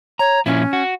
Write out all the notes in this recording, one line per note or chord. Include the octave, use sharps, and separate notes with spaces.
C#5 A#5
A#2 F3 C#4 E4
F#4